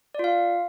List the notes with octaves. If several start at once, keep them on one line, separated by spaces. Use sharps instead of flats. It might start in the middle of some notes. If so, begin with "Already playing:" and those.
F4 D5 F5